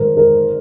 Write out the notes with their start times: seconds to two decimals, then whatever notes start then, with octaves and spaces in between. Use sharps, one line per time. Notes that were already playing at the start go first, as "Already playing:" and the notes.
Already playing: G#2 D#3 A#4 C5
0.17 A#4